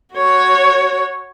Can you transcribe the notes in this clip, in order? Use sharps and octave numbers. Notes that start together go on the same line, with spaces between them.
F#4 C#5